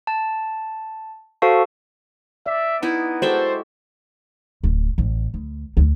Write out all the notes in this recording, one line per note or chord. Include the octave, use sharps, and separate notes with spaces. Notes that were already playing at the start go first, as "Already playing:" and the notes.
A5
F#4 A4 C5 F5 A5 C#6
D5 E5
B3 D#4 E4
G#3 F#4 A4 C5 D5 E5 G5
D1
A1
D2
D2